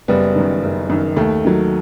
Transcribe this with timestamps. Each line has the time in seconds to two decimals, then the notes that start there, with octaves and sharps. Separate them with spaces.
0.08 F#1 G3 B3
0.35 F#2 D#3
0.63 F#1
0.90 F#2 D#3
1.16 D#2 A3
1.44 D#3 F#3